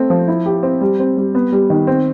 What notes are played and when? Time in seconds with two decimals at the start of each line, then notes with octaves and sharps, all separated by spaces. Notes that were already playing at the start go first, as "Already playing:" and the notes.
Already playing: A3 C4
0.10 F3
0.28 E4
0.46 G4
0.63 C4
0.81 G3
1.00 C4
1.17 G3
1.35 B3
1.52 G3
1.70 D#3
1.87 C4